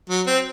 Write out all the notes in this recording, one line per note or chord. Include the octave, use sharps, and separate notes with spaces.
F#3
C4